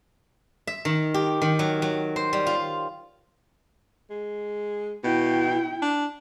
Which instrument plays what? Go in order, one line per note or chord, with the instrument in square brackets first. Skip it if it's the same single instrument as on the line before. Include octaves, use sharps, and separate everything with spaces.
[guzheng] E5
D#3
G4
D#3
F#3
F#3
C5
G3
F4
[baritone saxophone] G#3
[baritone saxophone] B2 [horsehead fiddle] E4 G5
[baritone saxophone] D4